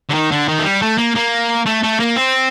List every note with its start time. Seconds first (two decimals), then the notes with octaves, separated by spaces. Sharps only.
0.10 D3
0.14 D#3
0.32 D3
0.48 D#3
0.59 A3
0.65 G3
0.82 A3
0.98 A#3
1.16 A#3
1.66 A3
1.83 A3
2.00 A#3
2.16 C4